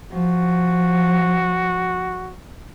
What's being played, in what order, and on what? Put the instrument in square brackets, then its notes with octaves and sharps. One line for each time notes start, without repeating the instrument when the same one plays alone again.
[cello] F3 [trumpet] F#4